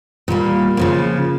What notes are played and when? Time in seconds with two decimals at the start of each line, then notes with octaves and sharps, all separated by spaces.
0.28 A#2 G3 A#3
0.77 C#3 F3 A#3